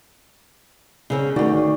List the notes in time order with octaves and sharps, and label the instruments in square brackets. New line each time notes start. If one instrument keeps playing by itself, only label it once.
[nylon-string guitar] C#3 C4 C#4
[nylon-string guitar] D2 F#4 [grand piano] D#3 D5